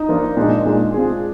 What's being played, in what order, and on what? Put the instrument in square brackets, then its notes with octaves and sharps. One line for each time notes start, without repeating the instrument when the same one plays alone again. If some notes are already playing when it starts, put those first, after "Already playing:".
Already playing: [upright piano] D#4
[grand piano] F3 A#3 D4 F4
[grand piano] A#2 G#3 D#4 [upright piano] D4
[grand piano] A#2 G#3 D#4
G#3 C4 F4 G#4